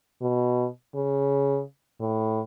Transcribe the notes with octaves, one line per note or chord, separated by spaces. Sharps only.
B2
C#3
A2